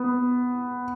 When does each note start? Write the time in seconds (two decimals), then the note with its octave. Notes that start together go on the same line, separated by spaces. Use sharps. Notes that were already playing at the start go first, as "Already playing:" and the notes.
Already playing: B3